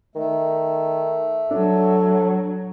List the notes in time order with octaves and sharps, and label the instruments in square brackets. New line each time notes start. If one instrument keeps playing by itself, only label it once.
[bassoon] D#3 [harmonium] A3
[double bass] F#3 [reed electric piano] D4 [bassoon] A4